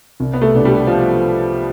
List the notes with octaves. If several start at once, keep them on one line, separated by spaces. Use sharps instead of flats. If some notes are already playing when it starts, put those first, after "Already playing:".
C2
B3
A3
B2 B3 D4 G4
G3
F3